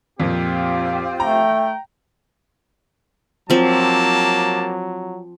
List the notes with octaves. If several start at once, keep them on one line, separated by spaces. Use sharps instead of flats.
F2 A#2 C4 F4 G4
A3 G5 A#5
F3 F#3 A#3 C4 G4 A5